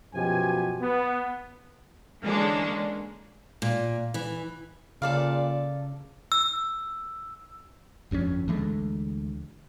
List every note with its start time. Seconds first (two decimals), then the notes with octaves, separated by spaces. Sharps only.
0.13 F#2 B2 F3 G4 G#5
0.81 B3
2.22 D3 E3 G#3 A#3 C#4 D4
3.62 A#2
4.14 E3
5.02 A#2 C#3 A4 D5 F5
6.32 E6
8.11 G1 F2 C4 C#4
8.48 D2 E3 G#3 A3